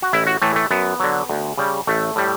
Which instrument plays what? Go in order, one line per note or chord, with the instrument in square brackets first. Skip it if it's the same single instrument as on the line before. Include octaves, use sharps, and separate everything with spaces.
[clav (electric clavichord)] F#4
A1 E4
F#4
A2 E3 A3
A3
F#2 B3
D3 F#3
D2
C#3 G3
A1 A3
A2 G3